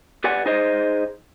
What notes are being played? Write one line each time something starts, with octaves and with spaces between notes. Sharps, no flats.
G4 B4 D5 F#5 G#5
D#4 G#4 C5 D#5